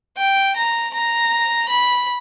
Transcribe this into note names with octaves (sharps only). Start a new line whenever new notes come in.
G5
A#5
A#5
B5